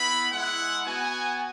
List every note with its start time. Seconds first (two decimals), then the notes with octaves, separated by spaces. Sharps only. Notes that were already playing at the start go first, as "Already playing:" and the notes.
Already playing: B3 E4 B5
0.31 G#3 E4 F#5
0.86 B3 F#4 G#5